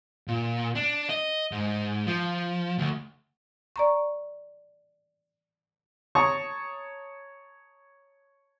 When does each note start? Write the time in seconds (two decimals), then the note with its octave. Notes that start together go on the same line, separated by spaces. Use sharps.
0.28 A#2
0.75 D4
1.09 D#5
1.52 G#2
2.07 F3
2.78 D2
3.76 D5 A#5 C#6
6.15 C#5 A5 A#5 C#6 D#6